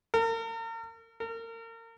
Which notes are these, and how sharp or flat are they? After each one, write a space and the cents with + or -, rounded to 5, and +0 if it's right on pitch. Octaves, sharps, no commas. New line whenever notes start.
A#4 -40
A#4 -35